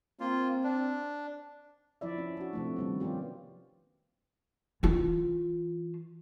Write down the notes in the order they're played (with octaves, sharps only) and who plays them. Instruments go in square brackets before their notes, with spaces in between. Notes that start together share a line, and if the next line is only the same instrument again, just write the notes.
[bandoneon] A#3 F4 [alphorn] C4
[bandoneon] D4
[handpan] F3 E4 D5 E5
C#4
D4 F#4
C3 F3 A3
D#3 G3 B3
F3 B3 C#4 F4 G4
[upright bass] E3 F4